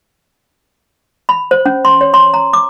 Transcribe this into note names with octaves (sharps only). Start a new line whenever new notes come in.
B5
C5
C#4
C6
C#5
C6
A#5
D6